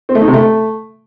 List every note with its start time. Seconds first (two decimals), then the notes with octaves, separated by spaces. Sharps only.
0.09 C4
0.15 A3
0.21 D#4
0.27 C3
0.34 A3